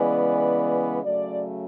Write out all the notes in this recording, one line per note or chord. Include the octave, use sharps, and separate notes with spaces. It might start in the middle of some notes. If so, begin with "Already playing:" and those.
Already playing: C#3 E3 G#3 B3 D5
C#3 F#3 A3 D5